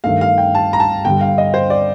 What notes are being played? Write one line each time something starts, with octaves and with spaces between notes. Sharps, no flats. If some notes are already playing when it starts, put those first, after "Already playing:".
G2 D#3 A3 F5
F5
G5
A5
A#5
A5
G2 D3 G3 G5
F5
D#5
C5
D5